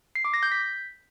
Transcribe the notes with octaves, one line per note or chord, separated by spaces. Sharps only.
C7
D6
A#6
G6
B6